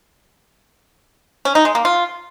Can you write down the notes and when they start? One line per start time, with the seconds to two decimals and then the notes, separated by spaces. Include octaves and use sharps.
1.45 C#4
1.55 D#4
1.65 G#3
1.75 A#3
1.85 F4